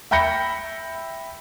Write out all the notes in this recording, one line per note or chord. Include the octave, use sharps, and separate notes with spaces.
E5 G5 B5 G6 A#6 C#7